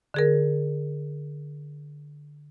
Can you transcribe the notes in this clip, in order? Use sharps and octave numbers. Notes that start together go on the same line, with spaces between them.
D3 G#4 A#4